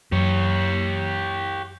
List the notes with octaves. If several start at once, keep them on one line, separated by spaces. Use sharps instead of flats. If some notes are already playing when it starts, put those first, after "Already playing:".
F#2 G4 C#5